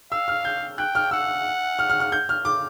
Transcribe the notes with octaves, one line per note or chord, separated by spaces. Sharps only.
F5 E6
F6
G6
G5 F#6
F6
F#5 E6
F6
F6
F6
G6
F6
D6